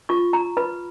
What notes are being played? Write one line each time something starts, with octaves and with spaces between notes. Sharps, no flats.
F4 C#6
A#5
B4 B5